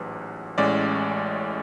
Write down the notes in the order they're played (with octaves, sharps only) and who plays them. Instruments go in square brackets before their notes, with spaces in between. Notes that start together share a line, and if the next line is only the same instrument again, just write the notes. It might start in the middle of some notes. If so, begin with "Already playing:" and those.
Already playing: [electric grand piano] A1 G#2 F#3 B4
A1 A2 G#3 C#4 D5